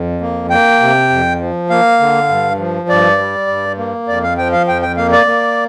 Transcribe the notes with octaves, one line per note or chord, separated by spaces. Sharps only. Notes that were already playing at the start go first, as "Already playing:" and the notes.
Already playing: F2
A#3
A#3 G5
C3
F2
F3
A#3 F5
D3
G2
F3
G2 D5
G3
G2
A#3
F2 D5
F5
F3 G5
F5
F2 G5
G5
A#3 F5
D5
A#3